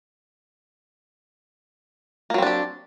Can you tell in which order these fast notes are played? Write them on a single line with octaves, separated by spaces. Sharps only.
A#3 F#3 C4 D4 G4